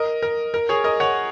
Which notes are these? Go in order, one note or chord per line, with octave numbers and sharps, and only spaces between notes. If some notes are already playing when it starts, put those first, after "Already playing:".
Already playing: A#4 D#5
A#4
A#4
G#4 C#5
A#4 D#5
C#5 F#5